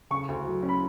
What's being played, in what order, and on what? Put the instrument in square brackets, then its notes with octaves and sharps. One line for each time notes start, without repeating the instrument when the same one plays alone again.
[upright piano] C#3 C#6
D2
F#3
C#4
B5